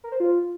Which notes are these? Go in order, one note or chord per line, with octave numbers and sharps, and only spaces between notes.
A#4
C5
F4